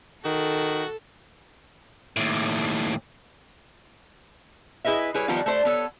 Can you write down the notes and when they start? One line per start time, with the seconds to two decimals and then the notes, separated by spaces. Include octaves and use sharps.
0.25 D#3 F#4 A4
2.17 D#2 A2
4.84 E4 G#4 B4 D#5 E5
5.14 G3 E4 G#4 B4 C#5
5.28 D#3 F3 G3 B3 D#4 F4
5.46 A3 C5 D5
5.65 B3 A4 C#5